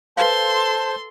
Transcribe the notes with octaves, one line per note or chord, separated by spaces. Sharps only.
A4 B4 C5 F5 A5 C6